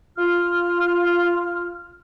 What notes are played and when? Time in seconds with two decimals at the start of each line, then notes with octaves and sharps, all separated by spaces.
0.18 F4 F6